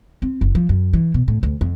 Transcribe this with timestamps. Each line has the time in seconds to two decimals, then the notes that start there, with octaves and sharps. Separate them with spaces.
0.22 C4
0.41 F#1
0.55 F3
0.69 F#2
0.93 E3
1.14 B2
1.28 A2
1.43 D2
1.61 F2